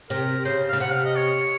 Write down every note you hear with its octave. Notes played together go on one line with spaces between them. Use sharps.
C3 A#4
C#3 C5
C#3 F5
C3 F#5
F5
D#5
C#5